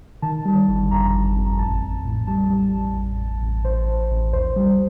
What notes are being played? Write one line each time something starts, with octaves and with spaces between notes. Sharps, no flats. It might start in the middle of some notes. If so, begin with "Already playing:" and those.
D#3 A5
G3
G1
F2 A#5
G1
F2
A1 A5
A1
A2
G3 A5
G3
A1
A1
A1
A1
A1 C5
A1
A1
D#2 C5
G3